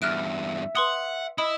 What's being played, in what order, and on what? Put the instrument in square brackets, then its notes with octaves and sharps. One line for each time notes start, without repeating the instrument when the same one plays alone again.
[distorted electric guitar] E2 G2 [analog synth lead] E5 [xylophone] F6 F#6 D7
[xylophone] B4 C6 D#6 [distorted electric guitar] F#5
[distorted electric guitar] E4 [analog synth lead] D#5 [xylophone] B5 D#6